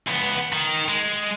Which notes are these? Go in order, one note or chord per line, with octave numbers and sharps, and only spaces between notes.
C#2 B3
D#3
G#3